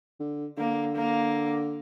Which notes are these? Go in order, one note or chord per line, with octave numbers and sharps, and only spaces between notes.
D3
D3 A#3
A#3